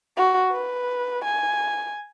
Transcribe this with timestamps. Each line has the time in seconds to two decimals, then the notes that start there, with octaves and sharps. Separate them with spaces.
0.17 F#4
0.52 B4
1.25 G#5